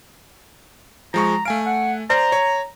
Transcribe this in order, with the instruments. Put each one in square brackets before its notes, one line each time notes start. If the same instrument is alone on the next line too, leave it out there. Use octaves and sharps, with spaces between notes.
[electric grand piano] F3 G#3 C#6 [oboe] A#5
[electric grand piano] A3 G#5 D7 [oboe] F5
[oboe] F#5
[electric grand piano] C5 D5 [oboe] A#5
[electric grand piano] C#5